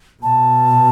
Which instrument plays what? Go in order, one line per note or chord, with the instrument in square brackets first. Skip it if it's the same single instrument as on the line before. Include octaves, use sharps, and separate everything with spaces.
[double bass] B2 [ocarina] A5